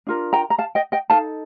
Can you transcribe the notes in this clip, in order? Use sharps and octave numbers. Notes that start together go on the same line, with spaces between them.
D4 F4 A#4
G5 A#5
A#5
F5 A5
D#5 G5
D#5 G5
D#4 A4 F5 A5